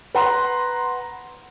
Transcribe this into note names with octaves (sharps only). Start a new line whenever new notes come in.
B4 F#5 A#5 C6